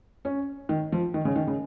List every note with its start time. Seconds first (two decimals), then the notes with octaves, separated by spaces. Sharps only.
0.25 C#4
0.69 D#3
0.92 F3
1.14 D#3
1.25 C#3
1.36 D#3
1.47 C#3